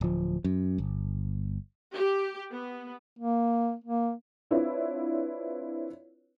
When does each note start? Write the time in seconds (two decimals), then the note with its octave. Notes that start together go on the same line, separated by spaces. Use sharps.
0.01 D1 F3
0.44 F#2
0.78 G1
1.94 G4
2.53 B3
3.19 A#3
3.85 A#3
4.51 C4 D4 E4 F4 B4 C#5